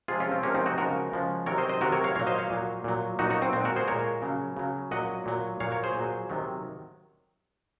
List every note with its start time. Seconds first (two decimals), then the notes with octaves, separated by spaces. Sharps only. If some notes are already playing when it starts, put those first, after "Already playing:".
0.08 C3 F3 G#3 F4 G#4
0.20 C#4 F4
0.31 C4
0.43 C3 F3 G#3 A#3 C#4
0.55 C4 D#4
0.66 D#4 F#4
0.78 C#3 F3 G#3 F#4 A#4
1.12 C#3 F3 G#3
1.46 C3 D#3 F#3 A#4 C#5
1.58 C5 D#5
1.69 C5 D#5
1.81 C3 D#3 F#3 F#4 A#4
1.92 A#4 C#5
2.04 C#5 F5
2.16 A#2 F#3 C#5 F5
2.27 C5 D#5
2.38 C#5 F5
2.50 A#2 F#3
2.84 A#2 F#3
3.19 A#2 D#4 F#4
3.22 F#3
3.30 D#4 F#4
3.42 C4
3.53 A#2 G#3 C4
3.65 F#4 A#4
3.76 G#4 C5
3.88 A#2 G#3 A#4 C#5
4.22 C#3 F#3
4.57 C#3 F#3
4.91 A#2 F#3 D#5 F#5
5.26 A#2 F#3
5.60 A#2 F#3 C#5 F5
5.72 A#4 C#5
5.84 G#4 C5
5.95 A#2 F#3
6.30 C3 D#3 F#3